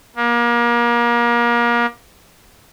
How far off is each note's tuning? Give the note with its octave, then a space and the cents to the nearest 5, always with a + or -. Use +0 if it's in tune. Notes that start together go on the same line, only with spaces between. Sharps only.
A#3 +30